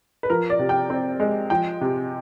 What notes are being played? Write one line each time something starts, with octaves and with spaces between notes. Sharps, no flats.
B4
F3 A#4
D5
C3
G5
C4
G#3
F3 G5
C3